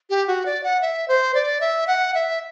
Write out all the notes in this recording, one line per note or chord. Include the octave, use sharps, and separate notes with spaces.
G4
F#4
D5
F#5
E5
C5
D5
E5
F#5
E5